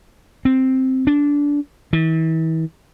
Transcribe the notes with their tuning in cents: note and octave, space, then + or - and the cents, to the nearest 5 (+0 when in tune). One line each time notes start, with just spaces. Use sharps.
C4 +0
D4 -20
E3 -40